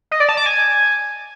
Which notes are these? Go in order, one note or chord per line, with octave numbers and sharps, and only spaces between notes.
D#5
D5
A5
D6
G#5